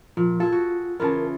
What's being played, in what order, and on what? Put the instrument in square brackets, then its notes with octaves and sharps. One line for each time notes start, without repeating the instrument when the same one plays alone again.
[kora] A#2 [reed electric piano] F3
[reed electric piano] F4 [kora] G#4 A4
[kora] F#4
[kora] C#3 E3 F4 [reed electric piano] A#4 A5